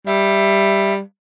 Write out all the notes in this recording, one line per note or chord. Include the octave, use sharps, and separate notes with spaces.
G3 E5